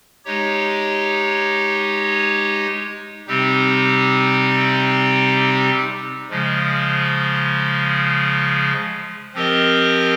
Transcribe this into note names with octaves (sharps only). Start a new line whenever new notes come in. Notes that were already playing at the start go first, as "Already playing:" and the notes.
G#3 D#4 G4 C#5
C3 G3 C4 D#4 G4
C#3 F3 G#3
F3 C4 G4 A#4 D#5